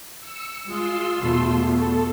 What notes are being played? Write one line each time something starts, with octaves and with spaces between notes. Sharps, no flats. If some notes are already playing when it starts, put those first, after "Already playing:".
E6 C#7
G#3 F4 C6 E6
E2 B2 A3
A4